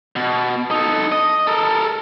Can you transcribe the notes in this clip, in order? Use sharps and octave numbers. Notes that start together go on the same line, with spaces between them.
B2
D#4 A4
D#5
A4 A#4